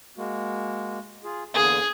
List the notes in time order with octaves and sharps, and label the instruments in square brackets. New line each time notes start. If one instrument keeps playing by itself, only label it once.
[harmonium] G#3 A#3 F#4
F4 G#4
[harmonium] E2 D3 A#3 [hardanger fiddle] G#4